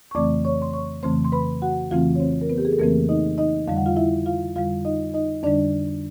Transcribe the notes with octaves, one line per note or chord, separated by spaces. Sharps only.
C#6
F2 C#3 E3 A3 C4 D5 D6
C#5 C#6
C6
C#5 C#6
F2 C#3 E3 A3 C4 C5 C6
C6
B4 B5
F#4 F#5
F2 C#3 E3 A3 C4 F4 F5
C#5
C4 C5
A#4
B3 B4
G4
G#4
A4
F2 C#3 E3 A3 A#3 C4 A#4
D#4 D#5
D#4 D#5
F2 D3 G3 F5
F#5
F4 F5
E4 E5
F4 F5
F2 D3 G3 F4 F5
D#4 D#5
D#4 D#5
F2 D3 G3 D4 D5